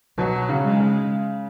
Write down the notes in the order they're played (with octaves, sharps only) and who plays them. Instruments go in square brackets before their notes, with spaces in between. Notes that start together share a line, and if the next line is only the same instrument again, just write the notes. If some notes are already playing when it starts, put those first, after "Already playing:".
[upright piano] B2 [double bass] F#3
[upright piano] C#3
[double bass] G#3
[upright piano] C#3